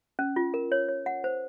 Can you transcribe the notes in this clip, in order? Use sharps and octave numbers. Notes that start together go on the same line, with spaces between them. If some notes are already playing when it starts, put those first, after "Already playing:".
C#4
F4
A#4
C#5
C#5
F#5
C5